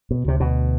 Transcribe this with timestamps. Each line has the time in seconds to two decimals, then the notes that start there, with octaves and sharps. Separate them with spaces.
0.11 B2
0.25 D2 C3
0.40 B2